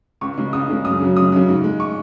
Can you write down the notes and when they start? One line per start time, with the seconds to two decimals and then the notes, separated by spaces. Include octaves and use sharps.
0.21 C#2 C#6
0.37 C#3 G#3
0.53 C#2 D#6
0.69 C#3 G#3
0.85 F#2 D#6
1.01 C#3 F#3
1.16 F#2 D#6
1.32 C#3 F#3
1.48 G#2
1.64 G#3
1.80 C#6